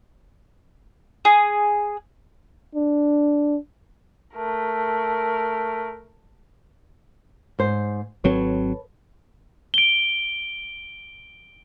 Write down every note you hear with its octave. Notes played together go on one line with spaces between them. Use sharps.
G#4
D4
A3 A#4
G#2 C5
G#1 F#3 C4 A4 B4 C#5
D7 G7